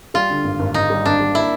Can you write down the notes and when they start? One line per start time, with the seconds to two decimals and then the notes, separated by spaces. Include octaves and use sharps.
0.14 G3 F4
0.30 D3
0.44 G#1
0.59 G#1
0.74 G#1 D#4
0.90 G3
1.05 G#1 D4
1.20 G3
1.35 A#3 E4